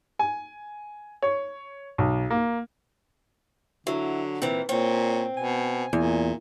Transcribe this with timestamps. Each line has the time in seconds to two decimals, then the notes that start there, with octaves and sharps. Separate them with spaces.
0.19 G#5
1.22 C#5
1.98 B1
2.30 A#3
3.87 D3 F#3 E4
4.42 A#2 E3 C4
4.69 A#2 C4 C#5
5.37 B2 G#5
5.93 E2 A#2